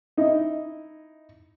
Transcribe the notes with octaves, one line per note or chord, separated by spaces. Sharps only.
D#4 E4 D#5